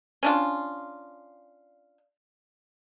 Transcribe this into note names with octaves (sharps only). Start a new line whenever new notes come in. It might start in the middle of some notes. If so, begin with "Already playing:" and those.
C#4 D4 F4